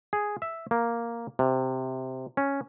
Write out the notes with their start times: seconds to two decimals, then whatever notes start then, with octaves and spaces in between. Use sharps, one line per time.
0.13 G#4
0.42 E5
0.71 A#3
1.39 C3
2.37 C#4